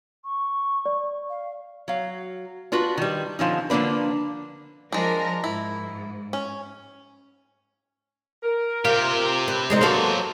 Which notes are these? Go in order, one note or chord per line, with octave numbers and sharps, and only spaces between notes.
C#6
D5
F5
F#3 F5
D4 F4 F#4 B4
D#3 G3
D3 F3 C#4 D#4
D3 F3 A#3 D4 B4
F3 G#3 D4 A#4 A#6
G#2 E4
C#4
A#4
C3 F4 G4
B4
G#3 C4 D#4
F#3 A#3 B3 F#4 A4 C5 F5